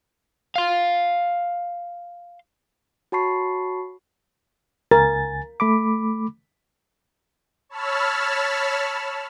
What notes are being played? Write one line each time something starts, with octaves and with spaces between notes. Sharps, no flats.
F5 C6
F#4 C#5 A5 B5 C#6 C7
C#2 A#4 G#5 A6
A3 B5 D6
C#5 A5 B5 E6 F6